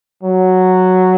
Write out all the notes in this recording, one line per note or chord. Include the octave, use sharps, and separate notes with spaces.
F#3